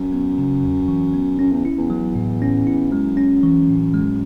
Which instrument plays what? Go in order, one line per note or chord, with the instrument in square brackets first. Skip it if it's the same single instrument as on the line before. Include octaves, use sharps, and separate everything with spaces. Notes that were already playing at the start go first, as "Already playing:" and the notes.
Already playing: [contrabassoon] F#2
[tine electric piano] B3
C#3
E2
E3
B3
[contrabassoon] F#2 [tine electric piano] C#4
[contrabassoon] E2
[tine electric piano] E4
[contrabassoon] E2
[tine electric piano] F#3
A2
C#4
E4
[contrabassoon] F#2 [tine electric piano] G#3
[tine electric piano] C#4
E3
A2
G#3